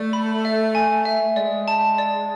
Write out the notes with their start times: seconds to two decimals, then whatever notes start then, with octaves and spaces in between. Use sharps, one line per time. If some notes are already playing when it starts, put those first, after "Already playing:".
Already playing: A3 D5
0.13 B5
0.45 E5
0.75 G#5
1.05 E5
1.36 G#3 D5
1.68 A5
1.98 D5